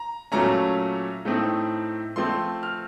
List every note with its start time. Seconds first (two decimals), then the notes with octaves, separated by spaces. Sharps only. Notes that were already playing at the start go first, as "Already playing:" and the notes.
Already playing: A#5
0.32 A#2 F#3 A3 C#4 A#5
1.25 A2 A3 C4 D#4
2.16 F3 A3 C4 C6
2.63 F6